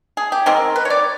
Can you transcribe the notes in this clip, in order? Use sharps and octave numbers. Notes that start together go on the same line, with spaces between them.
G#4
G4
D#3 G#3 C4 A#4
B4
C#5
D5